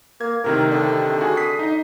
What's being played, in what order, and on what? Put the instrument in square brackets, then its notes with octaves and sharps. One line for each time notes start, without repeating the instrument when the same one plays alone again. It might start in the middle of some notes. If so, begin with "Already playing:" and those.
[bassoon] A#3 [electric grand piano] G#6
[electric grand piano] A2 C3 D#3 [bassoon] A#4
[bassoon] D3
[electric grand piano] F#4 G#4 G#5
D#6 B6 C7
D#4 D#5